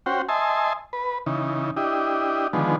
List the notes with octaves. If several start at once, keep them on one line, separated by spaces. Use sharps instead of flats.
C#4 F#4 C5 G5
D#5 E5 G#5 A5 C6
B4
C#3 E3 D#4
D4 E4 G4 D#5
D3 D#3 F3 G#3 B3